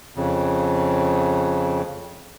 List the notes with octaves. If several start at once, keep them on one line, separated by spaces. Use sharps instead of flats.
F2 C#3